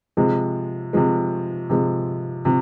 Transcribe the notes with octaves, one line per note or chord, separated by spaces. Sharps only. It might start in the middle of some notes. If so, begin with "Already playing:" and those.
C3 F3 G#3
C3 F3 G#3
C3 F3 G#3
C3 F3